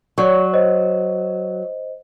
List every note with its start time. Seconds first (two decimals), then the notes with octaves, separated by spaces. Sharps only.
0.18 F#3 C#5 D5 C#6
0.53 C5 D#5